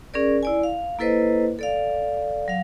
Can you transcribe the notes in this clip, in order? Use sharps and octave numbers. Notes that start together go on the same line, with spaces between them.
C#4 G#4 A#4 D5
E4 D5 G#5
F5
A#3 E4 A4 B4 C5 D#5
A4 D5 F5
F#3 F5